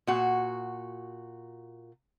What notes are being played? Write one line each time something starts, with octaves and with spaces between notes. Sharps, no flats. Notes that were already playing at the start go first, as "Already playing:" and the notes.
A#2 F#4